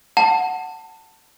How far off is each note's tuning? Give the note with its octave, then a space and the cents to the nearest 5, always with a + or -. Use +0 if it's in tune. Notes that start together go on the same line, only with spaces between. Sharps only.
F#5 +0 A5 +20